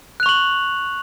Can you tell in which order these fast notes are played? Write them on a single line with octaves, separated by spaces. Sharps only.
F#6 F7 C#6 F#7